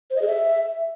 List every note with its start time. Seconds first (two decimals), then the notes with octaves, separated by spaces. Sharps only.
0.10 C5
0.16 D#5
0.22 G#4
0.28 E5